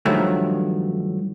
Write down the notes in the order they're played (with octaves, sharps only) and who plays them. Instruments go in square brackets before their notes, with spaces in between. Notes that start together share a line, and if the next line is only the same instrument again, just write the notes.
[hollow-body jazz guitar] G2 D#3 F3 F#3 A3